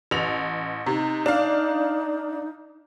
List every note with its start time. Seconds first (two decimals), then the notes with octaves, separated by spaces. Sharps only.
0.11 A1 F7
0.86 C3 D#4
1.26 D4 F5